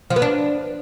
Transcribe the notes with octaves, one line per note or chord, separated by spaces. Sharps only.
F3
B3
D4